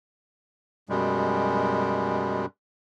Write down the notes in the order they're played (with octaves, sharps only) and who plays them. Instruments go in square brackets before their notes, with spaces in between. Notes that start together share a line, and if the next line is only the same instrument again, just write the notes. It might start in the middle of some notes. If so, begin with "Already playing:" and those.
[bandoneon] F#2 B2 G3 G#3